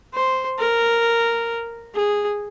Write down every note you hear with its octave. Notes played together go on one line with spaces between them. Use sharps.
C5
A#4
G#4